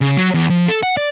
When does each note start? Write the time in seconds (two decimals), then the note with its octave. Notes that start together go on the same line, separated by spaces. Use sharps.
0.01 C#3
0.17 F#3
0.34 E2
0.50 F3
0.68 A4
0.83 F#5
0.97 D5